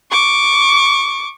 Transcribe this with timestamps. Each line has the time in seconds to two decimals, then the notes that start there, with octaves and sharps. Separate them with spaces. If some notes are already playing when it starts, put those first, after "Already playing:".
0.11 C#6 D6